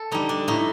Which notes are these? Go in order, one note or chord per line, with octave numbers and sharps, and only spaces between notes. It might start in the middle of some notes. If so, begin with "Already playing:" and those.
Already playing: A4
D3 G3 D#4
D4
A2 D#4